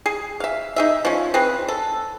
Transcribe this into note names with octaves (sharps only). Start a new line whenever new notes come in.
G#4
E5 F5
D#4 G#4 E5
F3 C#4
C4 G#4 B4
A4